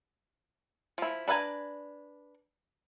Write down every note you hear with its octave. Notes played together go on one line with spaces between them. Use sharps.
F3 E4
D4 B4 E5 G#5 A#5